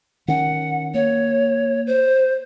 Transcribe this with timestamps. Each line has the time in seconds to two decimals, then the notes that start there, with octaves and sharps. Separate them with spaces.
0.28 D#3 C#4 F#5
0.94 A#3 C#5
1.87 C5